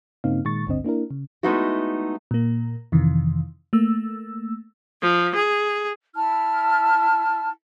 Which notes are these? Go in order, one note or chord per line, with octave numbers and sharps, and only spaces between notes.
G2 C#3 A#3 C4 D#4 F5
A#2 D#3 G#3 C#6 A6
G#1 C#2 G2 D3 C4 D#5
A#3 D4 E4 A#4
C#3
G#3 A3 B3 D#4 E4 F#4
A#2 A#3
F2 C3 D#3 E3
A3 A#3 E6
F3
G#4
E4 A5 F6